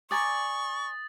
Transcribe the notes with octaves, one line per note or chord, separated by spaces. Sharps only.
D5 G#5 A#5 C#6 D#6 A6